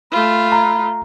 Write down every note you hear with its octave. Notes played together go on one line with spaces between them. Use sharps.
A3 F4 B5
A#5